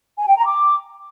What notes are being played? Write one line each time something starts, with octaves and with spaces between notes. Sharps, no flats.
G#5
G5
A#5
D6